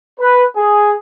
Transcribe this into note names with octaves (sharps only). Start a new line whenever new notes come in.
B4
G#4